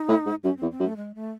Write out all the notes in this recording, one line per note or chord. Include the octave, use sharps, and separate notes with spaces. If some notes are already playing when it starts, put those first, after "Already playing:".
Already playing: D#4
A2
G#2
F#2 C#4
E2 C4
C4
F#2
A3
G#3
A3